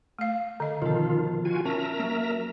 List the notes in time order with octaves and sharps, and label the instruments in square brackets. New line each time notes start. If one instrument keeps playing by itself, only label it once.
[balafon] A3 F5
D3 D#5
[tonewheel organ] B2 D#3 F4 [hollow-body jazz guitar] F3 A4
[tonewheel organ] F4 F#4 G#5
[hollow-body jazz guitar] C#4 A5 [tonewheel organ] A#4 E5 A#5
[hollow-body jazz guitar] F#3 A#3